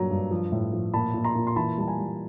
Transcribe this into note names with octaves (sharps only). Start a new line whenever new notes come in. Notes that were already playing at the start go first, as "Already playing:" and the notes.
Already playing: G2 A#2 F#3 A#5
G2
F3
A2
F3
A#2 A5 B5
A#2
A#5 C6
A#2
C6
E3 A5 B5
G3 A5
G#5 A#5
G3